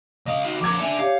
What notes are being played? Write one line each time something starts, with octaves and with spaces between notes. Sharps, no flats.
C#2 D#5 F5
D#4 F#4
F2 A#4 D6 G#6
D4 A4 D5 E5 G#5
G4 C#5 F5